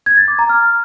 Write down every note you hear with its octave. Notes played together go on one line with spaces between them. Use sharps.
G#6
A6
D6
A#5
F6